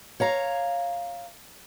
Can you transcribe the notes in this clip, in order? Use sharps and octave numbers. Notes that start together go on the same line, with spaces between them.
C#5 F5 A#5